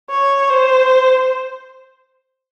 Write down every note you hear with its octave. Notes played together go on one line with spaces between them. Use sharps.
C#5
C5